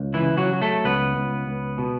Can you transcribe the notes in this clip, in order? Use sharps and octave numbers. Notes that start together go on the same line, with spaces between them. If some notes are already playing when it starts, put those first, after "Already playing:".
Already playing: C#2
E3 E4
C#3
F#3 F#4
F#3
A3 A4
C#2 B3 B4
C#2
C#2
B2